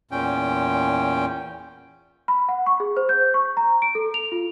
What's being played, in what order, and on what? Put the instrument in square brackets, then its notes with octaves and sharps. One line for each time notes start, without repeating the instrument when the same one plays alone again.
[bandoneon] E2 A#2 C#4 G5
[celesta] B5
F#5
C#6
G#4
C5
G6
C#6
A#5
D7
A4
F7
F4